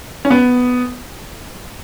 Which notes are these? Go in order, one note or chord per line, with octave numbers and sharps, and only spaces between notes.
C#4
B3